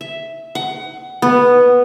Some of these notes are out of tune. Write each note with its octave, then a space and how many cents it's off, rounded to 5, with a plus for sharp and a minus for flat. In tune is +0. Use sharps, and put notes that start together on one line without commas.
E5 +0
F#5 +25
B3 -5